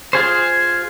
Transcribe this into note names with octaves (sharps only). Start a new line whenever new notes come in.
F4 G#4 C5